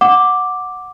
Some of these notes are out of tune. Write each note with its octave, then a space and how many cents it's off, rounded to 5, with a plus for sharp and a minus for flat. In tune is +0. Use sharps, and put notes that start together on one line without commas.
F#5 -10 D6 +0